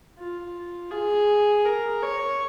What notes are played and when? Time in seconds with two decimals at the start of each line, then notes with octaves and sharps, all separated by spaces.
0.18 F4
0.91 G#4
1.65 A#4
2.02 C#5